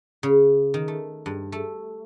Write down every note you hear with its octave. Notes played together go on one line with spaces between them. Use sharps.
C#3
D#3
A3
G2
A3